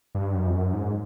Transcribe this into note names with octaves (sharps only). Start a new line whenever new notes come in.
G2
F#2
F2
F#2
G#2